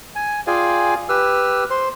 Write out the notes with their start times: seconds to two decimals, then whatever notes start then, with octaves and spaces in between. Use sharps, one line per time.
0.16 G#5
0.47 F4 G#4 D5 F5 G5 G#5
1.09 G4 B4 E6 F6
1.70 C5 C6